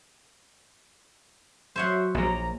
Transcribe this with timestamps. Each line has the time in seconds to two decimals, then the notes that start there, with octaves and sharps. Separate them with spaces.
1.76 F#3 C5 C#5 E5 F#5
2.15 A#1 A#2 A#5